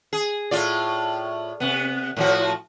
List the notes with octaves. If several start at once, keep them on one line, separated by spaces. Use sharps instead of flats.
G#4
A2 F4 D5
C3 B3
A2 F3 F#4